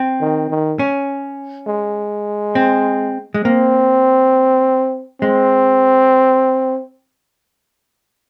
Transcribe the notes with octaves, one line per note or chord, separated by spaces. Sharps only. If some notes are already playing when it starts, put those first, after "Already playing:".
Already playing: C4
D#3
D#3
C#4
G#3
C4
G#3
A#3 C4
G#3 C4